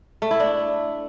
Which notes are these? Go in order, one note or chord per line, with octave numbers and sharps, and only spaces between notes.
A3
E4
D4